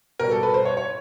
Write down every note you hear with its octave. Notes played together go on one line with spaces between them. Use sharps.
B2 G3 A#4
A4
B4
C5
C#5
C#5